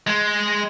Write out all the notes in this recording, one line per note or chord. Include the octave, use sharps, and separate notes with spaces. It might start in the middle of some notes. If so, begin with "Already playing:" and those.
G#3